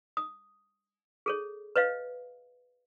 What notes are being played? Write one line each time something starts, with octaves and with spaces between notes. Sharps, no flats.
D#6
G#4 A4 C#5
B4 C#5 D#5 F5